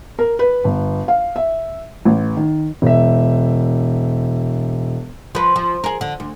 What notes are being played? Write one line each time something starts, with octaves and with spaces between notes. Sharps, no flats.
A#4
B4
G1
F5
E5
A1
D#3
E1 E5
F3 B4
F3
G#4 A#4
D3
D2